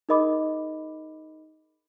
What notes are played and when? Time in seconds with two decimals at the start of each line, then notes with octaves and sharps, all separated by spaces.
0.09 D#4 G#4 A#4 D#5 B5 D6